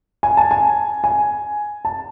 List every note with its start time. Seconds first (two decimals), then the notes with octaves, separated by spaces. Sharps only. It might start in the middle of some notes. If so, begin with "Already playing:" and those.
0.23 G#5
0.37 A5
0.51 G#5
1.04 G#5
1.85 A5